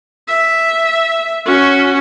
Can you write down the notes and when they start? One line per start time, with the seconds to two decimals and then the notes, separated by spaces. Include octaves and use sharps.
0.28 E5
1.46 C#4 F#4